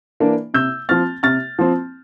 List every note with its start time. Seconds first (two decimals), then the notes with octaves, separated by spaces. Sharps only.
0.20 E3 A#3 D4
0.54 C3 E6 G6
0.89 F3 C4 F6 A6
1.23 C3 F6 A6
1.59 F3 C4